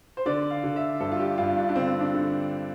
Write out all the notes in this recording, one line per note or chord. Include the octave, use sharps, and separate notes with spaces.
C5
D3 D5
F5
D3
E5
G2 A4
F4
G4
G2 F4
D4
D4
D3 C4
D4
D3